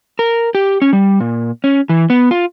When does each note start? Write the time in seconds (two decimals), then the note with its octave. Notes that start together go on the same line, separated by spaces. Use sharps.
0.19 A#4
0.55 G4
0.82 C#4
0.93 G3
1.21 A#2
1.64 C#4
1.89 E3
2.10 B3
2.31 F4